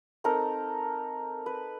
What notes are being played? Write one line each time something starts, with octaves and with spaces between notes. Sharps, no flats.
C4 D#4 A4 A#4
B4